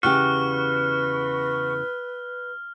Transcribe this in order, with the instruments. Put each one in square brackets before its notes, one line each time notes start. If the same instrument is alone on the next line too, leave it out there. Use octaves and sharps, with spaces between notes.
[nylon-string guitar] E2 C#3 G4 [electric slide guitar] F#4 [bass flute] B4 [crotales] F6